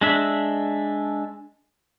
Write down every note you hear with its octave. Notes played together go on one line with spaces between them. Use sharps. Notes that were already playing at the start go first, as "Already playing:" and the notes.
G#3 D4 E5